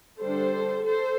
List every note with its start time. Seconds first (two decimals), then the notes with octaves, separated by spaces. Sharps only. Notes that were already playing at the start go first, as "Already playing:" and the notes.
0.20 D3 G3 D4 A4 C5
0.84 A4 C5